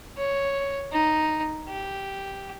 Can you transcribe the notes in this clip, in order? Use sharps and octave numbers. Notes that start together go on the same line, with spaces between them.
C#5
D#4
G4